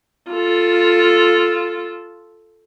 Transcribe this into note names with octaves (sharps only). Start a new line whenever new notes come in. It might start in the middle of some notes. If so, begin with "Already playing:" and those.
F4 A4